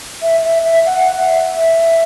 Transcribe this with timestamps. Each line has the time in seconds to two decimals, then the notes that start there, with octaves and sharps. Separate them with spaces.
0.22 E5
0.43 E5
0.64 E5
0.86 F#5
1.17 E5